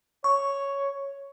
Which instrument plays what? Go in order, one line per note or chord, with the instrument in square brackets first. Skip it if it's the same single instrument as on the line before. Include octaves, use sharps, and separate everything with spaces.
[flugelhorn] C#5 [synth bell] C#6